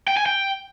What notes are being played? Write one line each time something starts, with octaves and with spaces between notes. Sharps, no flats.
G5
G#5
G5